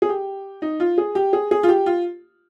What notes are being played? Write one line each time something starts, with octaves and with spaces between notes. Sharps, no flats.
G#4
G4
D#4
F4
G#4
G4
G#4
G#4
F4
G4
F4